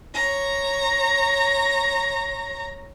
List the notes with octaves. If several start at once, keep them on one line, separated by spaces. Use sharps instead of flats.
C#5 A#5